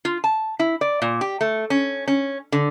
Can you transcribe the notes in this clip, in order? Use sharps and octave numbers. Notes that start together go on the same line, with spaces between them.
F4
A5
E4
D5
A#2
G4
A3
C#4
C#4
D3